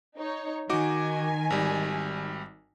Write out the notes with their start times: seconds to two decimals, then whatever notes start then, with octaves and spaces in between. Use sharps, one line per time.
0.17 D#4 C#5
0.69 D#3 D#4 F#4 G#5 D6
1.50 G#1 G3